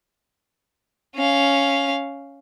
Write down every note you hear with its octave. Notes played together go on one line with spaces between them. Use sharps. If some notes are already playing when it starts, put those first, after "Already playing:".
C#4 F5